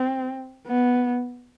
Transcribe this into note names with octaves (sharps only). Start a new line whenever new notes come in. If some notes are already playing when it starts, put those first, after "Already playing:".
Already playing: C4
B3